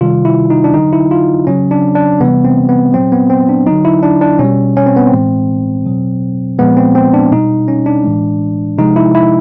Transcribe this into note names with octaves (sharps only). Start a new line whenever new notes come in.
C3 D#3 G3 F4
E4
D#4
D4
D3 F#3 D#4
E4
F4
C#3 F#3 C#4
D4
D4
C3 E3 G3 B3
C4
B3
A#2 F#3 C4
B3
C4
D4
D3 F#3 D#4
E4
D4
D4
B2 G3 C#4
C#4
C4
B3
C4
A2 E3 G#3
B2 F#3
A#2 F3 G#3 B3
C4
C4
D4
B2 G3 D#4
C#4
D4
A2 E3 G#3
C3 F3 G#3 D#4
E4
E4